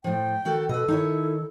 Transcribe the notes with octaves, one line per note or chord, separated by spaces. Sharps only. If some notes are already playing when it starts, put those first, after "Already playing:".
A2 F3 G5
D#3 F#4 A4
B2 A4 B4 D#5
D#3 D#4 E4 C#5